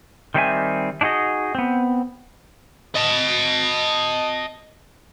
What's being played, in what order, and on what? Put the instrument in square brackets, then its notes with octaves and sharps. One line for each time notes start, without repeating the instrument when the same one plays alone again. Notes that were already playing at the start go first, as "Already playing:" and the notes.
[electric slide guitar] D#3 G3 C4 E4 E5 G#5
D4 D#4 F#4 G#4 D#5
B3 C4
[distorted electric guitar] D#5 A5